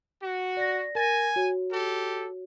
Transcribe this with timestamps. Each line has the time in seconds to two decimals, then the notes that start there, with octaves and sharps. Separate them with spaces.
0.23 F#4
0.57 D5 A#6
0.95 A#4 G#5 A6 A#6
1.36 F#4 C#5
1.71 G4 A4